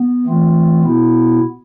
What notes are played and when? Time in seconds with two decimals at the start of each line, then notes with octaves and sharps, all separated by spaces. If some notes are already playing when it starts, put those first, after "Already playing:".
Already playing: B3
0.26 E3 A3 C4 F4
0.83 B2 B3 E4